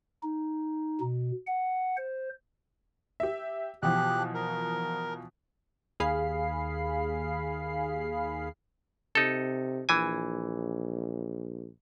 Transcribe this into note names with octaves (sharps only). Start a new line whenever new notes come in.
D#4
B2
F#5
C5
G4 E5
B2 E3 F3 G4 F#6
A#4
D#2 G#4 F5 B5 C7
C3 D#4 A4
A#1 E3 G#5